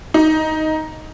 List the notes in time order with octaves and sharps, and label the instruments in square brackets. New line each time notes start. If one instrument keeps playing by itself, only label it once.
[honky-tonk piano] D#4